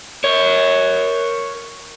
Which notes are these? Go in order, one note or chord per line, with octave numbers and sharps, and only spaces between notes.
A#4 C#5